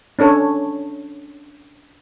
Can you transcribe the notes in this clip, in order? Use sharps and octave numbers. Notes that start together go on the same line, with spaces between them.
C#4 D4 A4 C#5